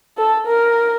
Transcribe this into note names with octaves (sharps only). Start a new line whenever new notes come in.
A4
A#4